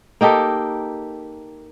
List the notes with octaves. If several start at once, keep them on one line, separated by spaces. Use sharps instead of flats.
A#3 D#4 G4 A4